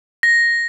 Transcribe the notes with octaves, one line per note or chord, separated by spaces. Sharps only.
A#6